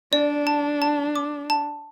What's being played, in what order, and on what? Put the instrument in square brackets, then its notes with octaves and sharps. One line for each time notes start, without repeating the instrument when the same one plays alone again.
[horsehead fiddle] D4 [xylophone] D5
[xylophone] A5
A5
D6
A5